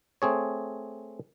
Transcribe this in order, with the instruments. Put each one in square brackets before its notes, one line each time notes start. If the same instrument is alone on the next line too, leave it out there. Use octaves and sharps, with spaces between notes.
[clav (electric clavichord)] A3 C4 G#4 C#5